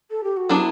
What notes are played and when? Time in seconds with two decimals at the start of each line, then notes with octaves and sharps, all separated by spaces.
0.11 A4
0.24 G4
0.37 F#4
0.49 F#3 B3 D4 E4 A4